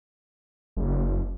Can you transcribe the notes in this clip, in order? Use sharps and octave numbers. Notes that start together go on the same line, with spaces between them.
F#1